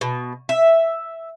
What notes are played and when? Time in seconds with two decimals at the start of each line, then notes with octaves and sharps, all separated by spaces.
0.01 B2
0.49 E5